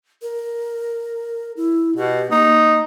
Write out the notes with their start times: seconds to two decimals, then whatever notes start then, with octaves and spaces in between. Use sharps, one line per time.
0.22 A#4
1.57 E4
1.96 B2 G4
2.31 A#3 D#4